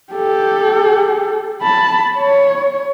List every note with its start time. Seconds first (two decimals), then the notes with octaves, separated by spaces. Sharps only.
0.12 G4 A4
1.62 A5 B5
2.17 C#5